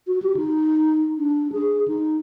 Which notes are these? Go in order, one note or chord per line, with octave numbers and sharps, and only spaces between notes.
F#4
G4
D#4
D4
G#4
D#4